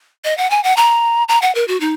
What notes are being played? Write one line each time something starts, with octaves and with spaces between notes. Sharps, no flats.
D#5
F#5
G#5
F#5
A#5
A#5
F#5
A#4
F#4
D#4